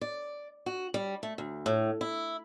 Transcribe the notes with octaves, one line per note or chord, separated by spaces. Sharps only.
D5
F#4
G3
A3
D2
A2
E4